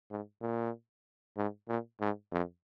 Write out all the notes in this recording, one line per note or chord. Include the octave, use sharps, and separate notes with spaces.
G#2
A#2
G#2
A#2
G#2
F2